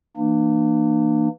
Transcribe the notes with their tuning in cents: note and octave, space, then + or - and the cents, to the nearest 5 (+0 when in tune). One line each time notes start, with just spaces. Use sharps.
E3 +10 A#3 +0 D4 +45